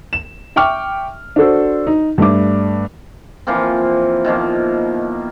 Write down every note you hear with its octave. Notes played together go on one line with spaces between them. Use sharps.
E7
E5 G5 C#6 D6 F6
D4 F#4 A4 C5
D#4
G2 A3 D4 D6
E3 F3 A#3 C4
B2 D#3 F3 A#3